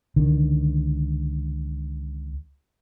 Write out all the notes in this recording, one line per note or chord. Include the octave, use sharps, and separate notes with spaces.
C#2 D3 D#3